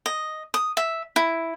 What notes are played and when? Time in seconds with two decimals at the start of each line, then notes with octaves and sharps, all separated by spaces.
0.06 D#5
0.54 D#6
0.77 E5
1.16 E4